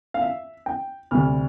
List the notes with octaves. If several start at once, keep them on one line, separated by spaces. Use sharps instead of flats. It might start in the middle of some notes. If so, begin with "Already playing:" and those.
F5
E5
G5
D2 C3 G3 F6